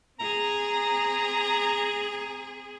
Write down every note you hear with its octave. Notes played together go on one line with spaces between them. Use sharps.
C4 G#4 A#5